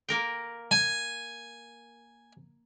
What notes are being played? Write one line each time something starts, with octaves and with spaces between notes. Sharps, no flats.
A#3 A#4 G5
G#5